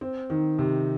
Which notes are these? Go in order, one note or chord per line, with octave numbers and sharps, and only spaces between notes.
C4
D#3
C3